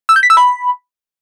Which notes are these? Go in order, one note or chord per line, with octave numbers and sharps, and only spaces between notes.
E6
G6
B6
E6
B5